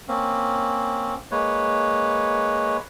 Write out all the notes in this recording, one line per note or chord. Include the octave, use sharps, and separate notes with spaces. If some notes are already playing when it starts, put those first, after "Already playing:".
A#3 C4 C#4
G#3 A#3 B4 C#5